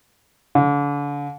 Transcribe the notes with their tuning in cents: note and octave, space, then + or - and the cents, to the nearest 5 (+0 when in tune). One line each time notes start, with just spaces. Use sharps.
D3 -35